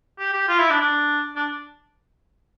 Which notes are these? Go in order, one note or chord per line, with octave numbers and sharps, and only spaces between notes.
G4
G4
F4
E4
D4
D4
D4